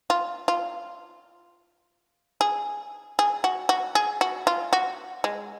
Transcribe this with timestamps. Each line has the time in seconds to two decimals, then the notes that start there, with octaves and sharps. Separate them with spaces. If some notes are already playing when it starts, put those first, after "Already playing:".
0.10 F4
0.48 F4
2.41 G#4
3.19 G#4
3.44 F#4
3.69 F#4
3.95 G#4
4.21 F#4
4.47 F4
4.73 F#4
5.24 G#3